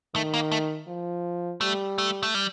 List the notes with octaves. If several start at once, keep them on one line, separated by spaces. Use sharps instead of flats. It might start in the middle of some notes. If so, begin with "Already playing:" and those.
D#3 A3
A#3
A3
F3
G3 A3
A3
A3
G3